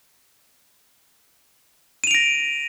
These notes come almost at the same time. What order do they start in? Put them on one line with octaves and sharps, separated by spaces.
D#7 F7 D7 A#6